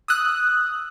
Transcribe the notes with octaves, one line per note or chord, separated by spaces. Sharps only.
D#6 E6 F#6